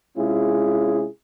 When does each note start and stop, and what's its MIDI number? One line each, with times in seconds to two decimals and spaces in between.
0.17 1.06 48
0.17 1.06 56
0.17 1.06 61
0.17 1.06 64
0.17 1.06 65
0.17 1.06 68